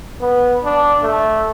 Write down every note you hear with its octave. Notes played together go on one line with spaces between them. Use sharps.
B3
D4
A3